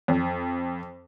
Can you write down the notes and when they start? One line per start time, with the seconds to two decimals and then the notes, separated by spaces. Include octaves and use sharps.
0.08 F2